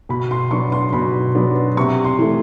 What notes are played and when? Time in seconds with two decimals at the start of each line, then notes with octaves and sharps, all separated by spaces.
0.09 B2 B5
0.31 C6
0.51 F#3 B3 D4 C#6
0.72 C6
0.93 B2 B5
1.35 F#3 B3 D4
1.77 C3 C#6
2.04 C6
2.19 E3 A3